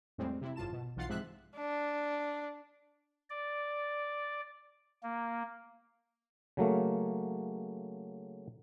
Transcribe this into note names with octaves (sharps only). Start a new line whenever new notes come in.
F2 A2 G3 G#3 C4
C3 E4
G#1 F#2 F4 A5 E7
B2
B1 E3 F4 F#5 A6 C7
G#2 C3 F3 G#3 E5 F#6
D4
D5
A#3
C#3 F#3 A3 A#3